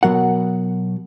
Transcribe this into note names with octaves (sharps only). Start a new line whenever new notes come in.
B2 F#3 A#4 F#5